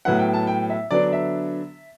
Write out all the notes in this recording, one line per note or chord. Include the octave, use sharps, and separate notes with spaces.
A2 F#3 B3 E4 F#5
G5
A5
G5
E5
D3 F#3 B3 D4 D5
E5